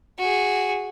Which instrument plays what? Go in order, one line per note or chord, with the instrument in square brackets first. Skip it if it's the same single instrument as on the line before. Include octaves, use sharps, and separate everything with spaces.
[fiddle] F#4 G#4